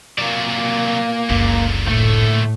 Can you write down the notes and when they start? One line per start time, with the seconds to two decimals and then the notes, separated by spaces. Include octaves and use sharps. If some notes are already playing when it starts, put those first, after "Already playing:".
0.18 C3 F#3 A#3 D5
1.29 F#1 C#2 A#2 D3
1.88 A2 A3